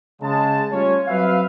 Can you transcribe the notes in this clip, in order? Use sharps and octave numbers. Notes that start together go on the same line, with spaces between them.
C#3 G#3 A5
G3 A3 C#4 F4 C#5
F#3 C4 B4 E5 F5